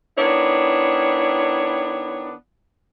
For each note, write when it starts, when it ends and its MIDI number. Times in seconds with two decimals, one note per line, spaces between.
0.18 2.32 51
0.18 2.32 59
0.18 2.32 62
0.18 2.32 64
0.18 2.32 73